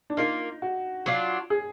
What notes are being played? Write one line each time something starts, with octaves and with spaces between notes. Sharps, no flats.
D4
A#3 D#4 F4 A#4
F#4
F#3 D4 F4
G#4